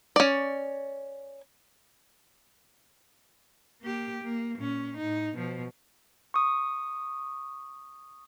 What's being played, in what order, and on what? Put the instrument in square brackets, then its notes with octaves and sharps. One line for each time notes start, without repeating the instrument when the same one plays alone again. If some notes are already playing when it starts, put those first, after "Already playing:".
[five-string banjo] C#4 D5
[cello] A#3 G4
A#3
A#2 C#4
A2 D#4
B2 F3
[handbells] C#6 D#6